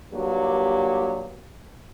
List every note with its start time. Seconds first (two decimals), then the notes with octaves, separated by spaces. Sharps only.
0.12 G2 A#2 F#3 A#3 G4